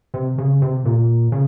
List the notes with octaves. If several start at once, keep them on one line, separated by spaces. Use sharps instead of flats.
C3
C#3
C3
A#2
C#3